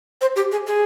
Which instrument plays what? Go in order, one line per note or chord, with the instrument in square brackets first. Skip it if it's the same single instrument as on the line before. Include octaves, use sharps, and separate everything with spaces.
[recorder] C5
G4
G#4
G#4